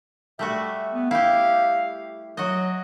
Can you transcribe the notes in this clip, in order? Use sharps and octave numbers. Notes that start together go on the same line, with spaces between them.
G3 A3 F#4 E5
B3
E4 G4 F5
F#3 F#4 D#5